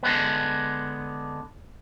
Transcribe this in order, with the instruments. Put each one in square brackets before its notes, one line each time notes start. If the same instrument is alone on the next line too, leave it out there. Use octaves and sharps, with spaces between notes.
[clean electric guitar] D3 G#3 B3